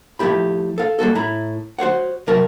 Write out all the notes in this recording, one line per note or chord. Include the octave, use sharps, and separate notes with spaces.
F3 A3 E4 G4 B5
A4 F5
G3 A#3 F#4 A4
A2 E4 A#5 B5
F#4 C5 C#5 F#5
C2 F#3 A#4 E5 A5